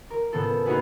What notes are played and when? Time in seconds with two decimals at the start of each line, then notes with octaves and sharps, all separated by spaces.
0.10 A#4
0.33 A2 C#3 F3 B3 A4
0.66 A#3 B3 D#4 F#4 G#4 B4